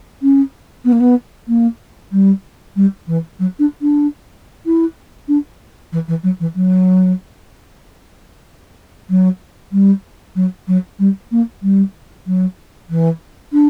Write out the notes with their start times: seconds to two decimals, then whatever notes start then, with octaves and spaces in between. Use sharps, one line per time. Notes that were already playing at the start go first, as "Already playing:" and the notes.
0.22 C#4
0.84 B3
0.92 A#3
1.00 B3
1.48 A#3
2.12 G3
2.76 G3
3.07 E3
3.39 F#3
3.59 D4
3.81 D4
4.66 E4
5.28 D4
5.92 E3
6.08 E3
6.23 F#3
6.40 E3
6.55 F#3
9.09 F#3
9.72 G3
10.35 F#3
10.67 F#3
10.99 G3
11.31 A#3
11.62 G3
12.26 F#3
12.89 E3
13.53 D4